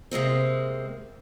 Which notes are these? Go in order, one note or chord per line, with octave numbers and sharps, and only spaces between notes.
C3 G#3 A#3 C4